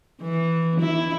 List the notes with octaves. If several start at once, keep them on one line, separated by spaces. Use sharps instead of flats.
E3
E4